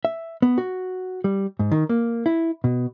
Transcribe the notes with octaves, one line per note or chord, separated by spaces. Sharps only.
E5
B3
F#4
G3
G#2
D#3
A#3
E4
B2